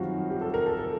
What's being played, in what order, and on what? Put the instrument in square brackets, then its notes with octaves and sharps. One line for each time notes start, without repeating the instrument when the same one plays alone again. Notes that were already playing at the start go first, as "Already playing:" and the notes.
Already playing: [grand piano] F#2 D#3 G3 C4 F4 F#4
G4
A4
A#4
A4
A4